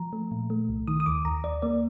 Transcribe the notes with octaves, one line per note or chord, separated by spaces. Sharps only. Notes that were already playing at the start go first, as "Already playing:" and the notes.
Already playing: F3 A#5
A3
A#2
A3
C2
D#3 D#6
D#6
D#2 D6
D#2 A#5
D#2 D5
A#3 D5